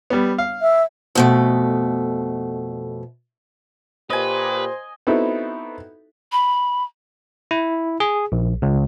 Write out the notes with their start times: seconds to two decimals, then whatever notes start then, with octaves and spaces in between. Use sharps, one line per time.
0.10 G3 B3
0.38 F5
0.62 E5
1.15 F2 B2 A3
4.10 A#2 G4 B4 C5 D#5 G#5
5.07 B3 C4 D#4 E4 F#4 A4
6.32 B5
7.51 E4
8.00 G#4
8.32 A#1
8.62 C#2